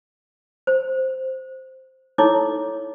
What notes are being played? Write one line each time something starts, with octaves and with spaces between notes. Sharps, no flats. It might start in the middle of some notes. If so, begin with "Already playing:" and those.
C5
D#4 E4 A4 C#5 D6